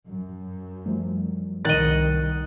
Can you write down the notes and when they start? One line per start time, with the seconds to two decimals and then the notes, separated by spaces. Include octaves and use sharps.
0.10 F#2
0.86 F3 G3 A3
1.65 C2 D#3 D#5 F#5 A6